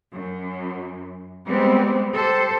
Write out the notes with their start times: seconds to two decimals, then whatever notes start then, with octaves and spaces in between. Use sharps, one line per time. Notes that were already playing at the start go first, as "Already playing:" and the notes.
0.13 F#2
1.47 G3 G#3 B3 C4
2.13 G4 A4 C5